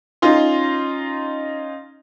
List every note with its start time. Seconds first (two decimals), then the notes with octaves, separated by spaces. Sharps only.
0.22 C#4 D#4 F4 C6